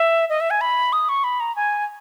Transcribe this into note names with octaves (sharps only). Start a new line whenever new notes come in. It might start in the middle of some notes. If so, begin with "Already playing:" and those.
Already playing: E5
D#5
E5
G#5
B5
D#6
C#6
B5
A#5
G#5